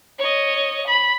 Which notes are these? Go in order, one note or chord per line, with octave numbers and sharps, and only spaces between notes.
C#5 D#5
B5